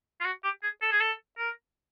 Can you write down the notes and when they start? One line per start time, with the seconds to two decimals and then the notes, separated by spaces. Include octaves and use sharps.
0.21 F4
0.25 F#4
0.44 G4
0.63 G#4
0.82 A4
0.92 G#4
1.01 A4
1.38 A#4